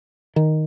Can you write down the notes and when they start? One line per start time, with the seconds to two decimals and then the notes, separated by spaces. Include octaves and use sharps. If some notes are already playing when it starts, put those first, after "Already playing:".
0.36 D#3